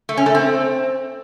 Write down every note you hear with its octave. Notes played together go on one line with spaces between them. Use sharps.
A3
C#4
A3
C4